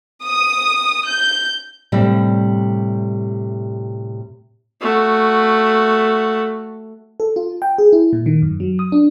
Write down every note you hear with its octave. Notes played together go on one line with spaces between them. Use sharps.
D#6
G6
A2 C3 G3
A3 F#4
A4
F4
G5
G#4
E4
A#2
D#3
F#2
F#3
D#6
D4